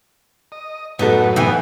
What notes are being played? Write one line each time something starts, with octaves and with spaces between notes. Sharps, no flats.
D#5
F#2 A2 B3 D#4 F#4 A4 B4
E3 B3 D#4 G5 G#5